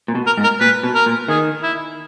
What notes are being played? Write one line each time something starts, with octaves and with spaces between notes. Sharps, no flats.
A#2
B2
A#4
G#2
A#4
A#2 B4
B2
A#4
A#2
D#3 G#4
E4